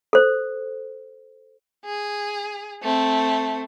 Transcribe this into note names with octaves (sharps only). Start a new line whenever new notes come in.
A4 C5
G#4
A3 C4